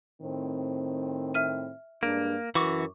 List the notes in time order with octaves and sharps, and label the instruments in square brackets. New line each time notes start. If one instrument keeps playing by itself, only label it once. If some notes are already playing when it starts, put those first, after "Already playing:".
[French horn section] A2 D#3 C4
[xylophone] E5 F6 D#7
[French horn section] G2 G#3 D4 [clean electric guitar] A#3 [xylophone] D7
[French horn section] F#2 [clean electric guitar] E3 F#4 [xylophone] C#6 D6